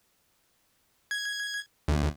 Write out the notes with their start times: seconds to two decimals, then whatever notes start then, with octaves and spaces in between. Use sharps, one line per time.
1.11 G#6
1.88 D2